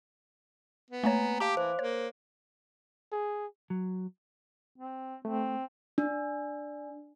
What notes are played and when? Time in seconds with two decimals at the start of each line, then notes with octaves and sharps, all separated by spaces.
0.90 B3
1.03 A3 A#3 C#5 G#5 A#5
1.40 G4 F5 A5 D6
1.57 E3 C5
1.79 A#3 C#5
3.12 G#4
3.70 F#3
4.78 C4
5.25 A3 C4
5.98 D4